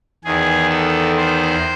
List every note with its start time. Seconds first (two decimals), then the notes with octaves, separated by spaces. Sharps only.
0.24 E2 D#3 G#4
0.70 A4
1.17 C5